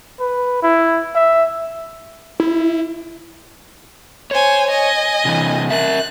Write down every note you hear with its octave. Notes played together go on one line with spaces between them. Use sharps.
B4
E4
E5
E4
C5 C#5 G#5
D#5 G#5
C3 E3
A#4 E5 F#6